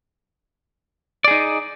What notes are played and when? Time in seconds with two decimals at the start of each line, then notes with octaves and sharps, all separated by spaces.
1.24 D5
1.28 G#4
1.31 D#4